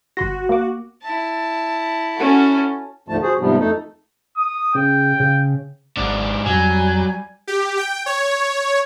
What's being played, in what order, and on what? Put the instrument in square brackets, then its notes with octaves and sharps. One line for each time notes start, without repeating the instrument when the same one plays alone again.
[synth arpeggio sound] G1 C6 A#6 [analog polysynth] F#4
[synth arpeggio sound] A#3 D6
[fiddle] E4 A5
[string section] C#4 F#4 A4
[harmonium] D2 G#2 D3 F3 A3 A5
F#4 G#4 C5
G#2 C3 F3 G3 B3 D4
F2 A3 D#4 A4
[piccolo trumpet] D#6
[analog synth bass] C#3 [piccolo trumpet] G5
[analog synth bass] C#3
[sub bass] G#1 [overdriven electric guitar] G#2 D4
[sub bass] F2 [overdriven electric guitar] F#3 [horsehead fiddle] G3 G#5
[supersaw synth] G4
G5
C#5